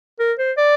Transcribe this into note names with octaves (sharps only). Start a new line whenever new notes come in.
A#4
C5
D5